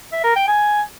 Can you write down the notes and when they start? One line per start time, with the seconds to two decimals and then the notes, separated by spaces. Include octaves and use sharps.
0.12 E5
0.24 A#4
0.36 G5
0.48 G#5